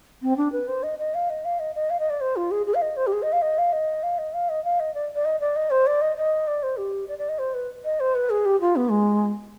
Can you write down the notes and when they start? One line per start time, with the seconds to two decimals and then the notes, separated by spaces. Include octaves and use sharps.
0.22 C4
0.37 D4
0.52 B4
0.68 C5
0.83 D#5
0.99 D#5
1.14 F5
1.30 D#5
1.45 F5
1.60 D#5
1.75 D#5
1.90 F5
2.00 D#5
2.10 D5
2.21 C5
2.36 F4
2.51 G#4
2.66 G#4
2.75 F5
2.82 D#5
2.97 C5
3.07 G4
3.13 G#4
3.22 D#5
3.33 F5
3.42 D#5
3.58 F5
3.73 D#5
4.03 F5
4.18 D#5
4.34 F5
4.49 D#5
4.65 F5
4.80 D#5
4.95 D5
5.15 D5
5.25 D#5
5.41 D5
5.56 D#5
5.71 C5
5.87 D5
6.02 D#5
6.17 D#5
6.47 D5
6.63 C5
6.77 G4
7.08 D5
7.19 D5
7.29 D#5
7.39 C5
7.54 B4
7.84 D#5
8.00 C5
8.15 B4
8.30 G#4
8.45 G4
8.61 F4
8.76 B3
8.91 G#3